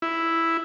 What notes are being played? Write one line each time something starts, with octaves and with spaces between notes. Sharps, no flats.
E4